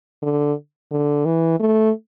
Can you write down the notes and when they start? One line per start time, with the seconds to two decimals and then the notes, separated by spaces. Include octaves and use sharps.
0.22 D3
0.91 D3
1.25 E3
1.60 A3